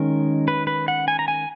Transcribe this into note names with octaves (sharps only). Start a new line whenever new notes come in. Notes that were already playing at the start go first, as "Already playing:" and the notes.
Already playing: D#3 G#3 C#4 A#4
B4
B4
F#5
G#5
A#5
G#5